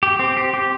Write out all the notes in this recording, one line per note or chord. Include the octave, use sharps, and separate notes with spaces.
G4
C4
G4
G4